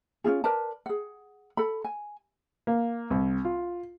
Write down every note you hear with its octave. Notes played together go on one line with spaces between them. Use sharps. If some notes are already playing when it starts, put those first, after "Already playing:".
C#4 D4 F4 G#4
A#4 B4 D5 A5
G#4 F#5
A4 B5
G#5
A#3
C2
F4